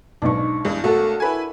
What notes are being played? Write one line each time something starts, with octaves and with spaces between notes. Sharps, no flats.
B1 G#2 D4 C#6
E2 G2 G#3
B1 A3 F#4 A4 A#4 F#5
E4 B4 G#5